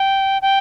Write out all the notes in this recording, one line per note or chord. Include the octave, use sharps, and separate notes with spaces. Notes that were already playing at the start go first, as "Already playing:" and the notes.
Already playing: G5
G5